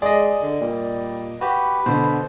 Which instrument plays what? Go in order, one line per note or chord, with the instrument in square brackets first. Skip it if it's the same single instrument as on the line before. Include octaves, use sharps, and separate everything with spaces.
[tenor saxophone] G#3 [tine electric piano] G#4 [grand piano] D5 D#5
[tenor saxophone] D3
[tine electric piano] A#2 [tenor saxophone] G3
[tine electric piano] F#4 G4 [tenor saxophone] B4
[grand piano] B2 D3 [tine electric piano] C5